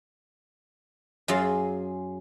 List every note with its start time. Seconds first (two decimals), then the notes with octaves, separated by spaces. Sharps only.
1.28 F#2 F#3 F4 G#4 C6